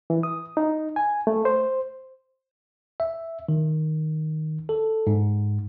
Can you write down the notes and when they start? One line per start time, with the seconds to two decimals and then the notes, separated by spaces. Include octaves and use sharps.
0.10 E3
0.23 D#6
0.57 D#4
0.96 G#5
1.27 A3
1.45 C5
3.00 E5
3.49 D#3
4.69 A4
5.07 G#2